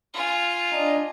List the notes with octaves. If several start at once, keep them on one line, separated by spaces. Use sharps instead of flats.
F4 G#5
D4 D#5 A#5